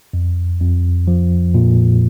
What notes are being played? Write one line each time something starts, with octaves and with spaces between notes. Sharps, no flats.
F2
F2
F3
A#2